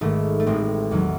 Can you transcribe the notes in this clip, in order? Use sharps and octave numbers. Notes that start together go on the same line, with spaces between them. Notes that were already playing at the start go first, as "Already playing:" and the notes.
G#1 G#2 D#3 A3
A3
A1 A2 G#3 C4
E2 D#3 F#3